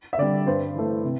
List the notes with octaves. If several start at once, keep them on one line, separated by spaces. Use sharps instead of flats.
E5
D3 G3 D5
G2 C5
E3 A3
C3